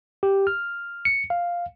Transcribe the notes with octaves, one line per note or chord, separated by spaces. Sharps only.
G4
F6
C#7
F5